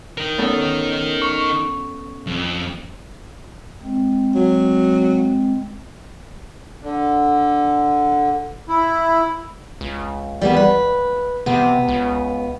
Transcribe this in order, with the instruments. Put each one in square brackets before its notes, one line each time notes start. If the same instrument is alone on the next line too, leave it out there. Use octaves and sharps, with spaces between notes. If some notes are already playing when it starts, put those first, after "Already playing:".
[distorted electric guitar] D#4 A#4
[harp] B3 C#4 A4
C#6
[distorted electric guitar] F2
[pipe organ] G#3 C4
[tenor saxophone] F#3
[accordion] D3
E4
[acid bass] C#2
[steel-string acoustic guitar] G3 A#3 B3
B4
[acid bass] C3 [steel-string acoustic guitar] B3
[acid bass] C#2